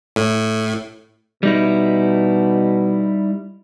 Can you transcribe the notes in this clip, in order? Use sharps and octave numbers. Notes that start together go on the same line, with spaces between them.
A2
B2 G3 D#4 E4